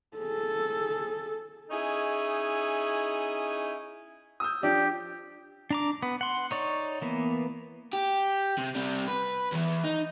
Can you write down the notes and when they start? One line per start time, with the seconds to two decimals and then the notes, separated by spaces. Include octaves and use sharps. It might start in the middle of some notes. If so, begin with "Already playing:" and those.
0.17 G#4 A4
1.70 C#4 D#4 E4 G#4
4.40 D#6 E6 G6
4.63 F3 D4 G4
5.70 D4 A#5 D6
6.03 B3
6.21 F#5 C6
6.51 D#4 C#5 D5
7.02 E3 A#3 B3
7.93 G4
8.58 C3
8.75 C3 G3
9.08 B4
9.52 E2 E3
9.84 D#4